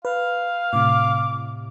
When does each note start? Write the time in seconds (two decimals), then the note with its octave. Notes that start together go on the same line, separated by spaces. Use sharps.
0.05 B4 F5
0.73 A2 C3 D6